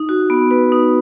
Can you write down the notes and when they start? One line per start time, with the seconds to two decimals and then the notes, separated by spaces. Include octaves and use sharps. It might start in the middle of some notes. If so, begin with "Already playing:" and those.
Already playing: D#4
0.09 F#4
0.30 B3
0.51 B4
0.72 D#4